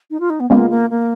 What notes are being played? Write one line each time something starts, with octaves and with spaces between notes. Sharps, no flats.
D#4
F4
D#4
B3
C#3 G#3 A#3 B3 F4
A#3
A#3